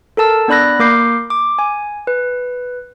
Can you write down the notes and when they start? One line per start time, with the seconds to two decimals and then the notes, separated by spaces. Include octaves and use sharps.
0.17 A4 A#4 A5 E6
0.48 B3 D4 D5 B5 F#6 A#6
0.79 A#3 A#4 D6 G6 C7
1.30 D6
1.59 G#5
2.07 B4